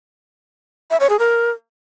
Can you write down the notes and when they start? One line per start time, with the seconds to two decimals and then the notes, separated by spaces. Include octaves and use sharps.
0.90 E5
1.00 C#5
1.10 G#4
1.19 A#4